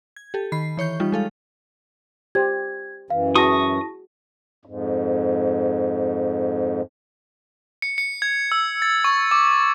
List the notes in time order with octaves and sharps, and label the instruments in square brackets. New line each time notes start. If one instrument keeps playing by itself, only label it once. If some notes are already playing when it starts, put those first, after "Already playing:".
[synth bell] G#6
G4 A4
D#3 B5 C7
E3 C#5 C#6 G6
G3 D#4 F4
G#3 A4 F5
[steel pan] G4 C5 [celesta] G#6
[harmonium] F#2 E3 [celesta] F5
[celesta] E4 A5 A#6 [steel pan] F#4 G#4 [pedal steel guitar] C#6 D#6
[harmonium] F2 G#2
[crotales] C#7
C#7
G#6
E6
A6
C#6
D6